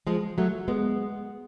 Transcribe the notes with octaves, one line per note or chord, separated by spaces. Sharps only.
F3 G#3
F#3 A3
G#3 B3